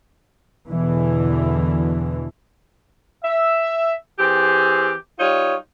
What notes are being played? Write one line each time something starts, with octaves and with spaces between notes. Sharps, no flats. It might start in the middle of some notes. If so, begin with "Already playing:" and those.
E2 B2 D3 E3
E5
E3 C4 G4 G#4
G3 D#4 F4 C#5